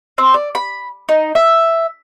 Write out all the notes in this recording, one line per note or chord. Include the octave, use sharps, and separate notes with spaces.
C4
D5
B5
D#4
E5